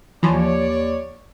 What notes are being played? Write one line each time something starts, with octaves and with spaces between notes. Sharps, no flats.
D#2 E3 F3 C#5 D5